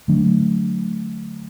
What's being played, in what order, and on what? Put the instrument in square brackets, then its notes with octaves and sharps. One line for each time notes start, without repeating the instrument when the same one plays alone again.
[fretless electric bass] D3 F#3 A3 D4